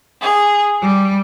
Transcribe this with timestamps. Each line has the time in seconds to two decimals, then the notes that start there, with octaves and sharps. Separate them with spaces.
0.21 G#4
0.81 G3